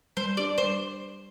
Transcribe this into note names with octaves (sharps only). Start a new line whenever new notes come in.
G3 C5
D4 G4 D5
G3 C5